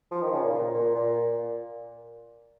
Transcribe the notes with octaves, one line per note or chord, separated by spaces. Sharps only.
F3
D#3
C#3
A#2
A#2
A#2
A#2